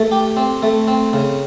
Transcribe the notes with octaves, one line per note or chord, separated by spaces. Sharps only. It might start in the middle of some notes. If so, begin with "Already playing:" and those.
Already playing: A3
G4
C4
A3
C4
C#3